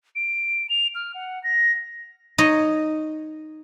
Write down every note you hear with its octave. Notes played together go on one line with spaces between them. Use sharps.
D7
F7
F6
F#5
A#6
D#4 C#5 D#5